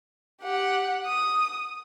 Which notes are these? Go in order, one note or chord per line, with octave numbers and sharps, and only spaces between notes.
G4 F#5
D#6